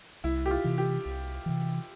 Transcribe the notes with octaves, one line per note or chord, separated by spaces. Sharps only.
C2 E4
G4
F4
C3 E3
G4
C2
C3 E3